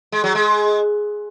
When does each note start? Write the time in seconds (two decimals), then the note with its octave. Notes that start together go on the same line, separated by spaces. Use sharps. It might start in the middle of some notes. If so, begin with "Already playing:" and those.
0.12 G#3
0.24 F#3
0.35 G#3